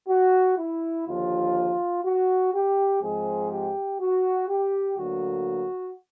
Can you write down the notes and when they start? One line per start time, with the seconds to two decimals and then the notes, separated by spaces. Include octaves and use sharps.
0.09 F#4
0.58 E4
1.07 D#2 D3 F3 F4
2.05 F#4
2.54 G4
3.02 G#2 F3 G#3 C4 G#4
3.52 G4
4.00 F#4
4.49 G4
4.98 D2 D3 F#3 A#3 F#4